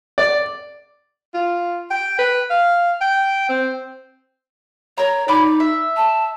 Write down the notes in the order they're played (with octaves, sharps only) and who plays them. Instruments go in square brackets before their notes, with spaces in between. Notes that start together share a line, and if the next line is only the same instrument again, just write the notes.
[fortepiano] D5
[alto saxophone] F4
G5
B4
F5
G5
C4
[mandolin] A#4 A#5 [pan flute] C#5
[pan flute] D#4 [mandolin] D5 B5 D6
[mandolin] E5
[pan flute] A5